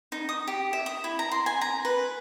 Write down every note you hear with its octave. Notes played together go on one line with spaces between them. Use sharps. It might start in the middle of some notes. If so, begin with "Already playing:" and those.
D#4
D#6
G4
E5
D#6
E4
A#5
C6
G#5
A#5
B4